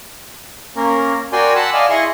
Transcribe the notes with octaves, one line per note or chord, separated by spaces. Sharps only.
A#3 C#4 A#4
F#4 A#4 D5 G5 G#5 C6
F#5 A5 B5 C6 E6
D5 D#5 F5 G#5
E4 G#4 D#5 C6 C#6